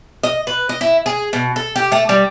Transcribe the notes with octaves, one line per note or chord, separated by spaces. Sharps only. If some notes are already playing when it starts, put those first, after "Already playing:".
D#5
B4
D#5
E4
G#4
B2
A4
G4
A3
G3